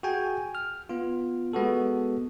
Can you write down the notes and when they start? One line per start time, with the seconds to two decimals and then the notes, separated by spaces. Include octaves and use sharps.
0.03 F#4 G#4 G5 G#5
0.55 F6
0.89 B3 F4
1.53 G#3 B3 F#4 A4